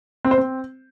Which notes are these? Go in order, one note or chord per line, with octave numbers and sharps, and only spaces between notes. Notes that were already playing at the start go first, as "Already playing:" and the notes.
C4
C5
C4